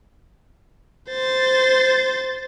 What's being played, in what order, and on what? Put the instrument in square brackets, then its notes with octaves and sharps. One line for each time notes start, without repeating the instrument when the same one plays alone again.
[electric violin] C5 A6